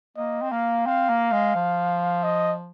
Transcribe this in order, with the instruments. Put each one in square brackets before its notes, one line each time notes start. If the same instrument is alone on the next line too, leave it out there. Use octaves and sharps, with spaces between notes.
[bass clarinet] A#3 [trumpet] D#5
[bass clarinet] C4
[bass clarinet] A#3 [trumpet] F5
[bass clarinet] C4 [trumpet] F5
[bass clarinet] A#3
G#3
F3
[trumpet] D#5